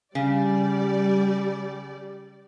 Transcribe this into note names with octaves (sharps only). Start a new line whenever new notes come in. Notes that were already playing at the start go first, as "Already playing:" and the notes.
C#3 G3 D5